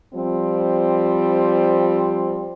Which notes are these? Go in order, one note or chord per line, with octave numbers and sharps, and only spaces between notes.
F3 G3 C4